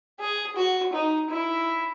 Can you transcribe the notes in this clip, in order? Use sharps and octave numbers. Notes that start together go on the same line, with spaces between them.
G#4
F#4
D#4
E4